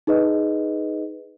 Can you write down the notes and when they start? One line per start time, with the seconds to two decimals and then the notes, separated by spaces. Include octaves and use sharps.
0.07 D#4 G#4 B4 D#5